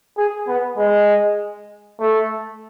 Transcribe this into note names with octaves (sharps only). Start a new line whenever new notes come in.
G#4
B3
G#3
A3